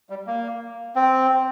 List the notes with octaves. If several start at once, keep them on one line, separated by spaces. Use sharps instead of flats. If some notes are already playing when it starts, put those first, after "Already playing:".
G3
A#3
C4